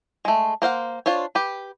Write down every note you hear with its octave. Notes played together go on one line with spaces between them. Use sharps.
G#3 A3
A#3 C5 F5 F#5
D4 F4 C5 C#5
G4 B4